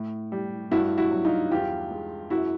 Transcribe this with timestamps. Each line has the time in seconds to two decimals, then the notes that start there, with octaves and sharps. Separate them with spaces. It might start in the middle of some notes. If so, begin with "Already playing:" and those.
Already playing: A2
0.32 G3
0.71 G2 E4 F#4
0.98 E4 F#4
1.11 F#3
1.25 D#4 F4
1.52 E2 F4 G4
1.91 G#3
2.30 F#2 E4 F#4